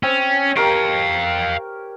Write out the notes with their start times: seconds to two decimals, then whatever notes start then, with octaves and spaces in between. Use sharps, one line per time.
0.03 C4 C#4
0.56 G4 A#4 C#5 F5 G5